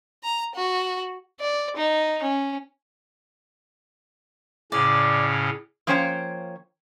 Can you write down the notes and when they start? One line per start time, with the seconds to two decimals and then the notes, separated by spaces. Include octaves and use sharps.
0.24 A#5
0.56 F#4
1.40 D5
1.77 D#4
2.23 C#4
4.72 A2 C#3 C#4 D5
5.87 F3 A#3 C#4 C5 C#5 G5